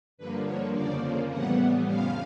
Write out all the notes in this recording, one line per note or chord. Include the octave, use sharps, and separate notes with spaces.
G2 D3 F3 A#3 B4
C#5
F2 C#3 F3 A#3 D5
A2 E3 G3 B3 F#5
F2 C#3 F3 F5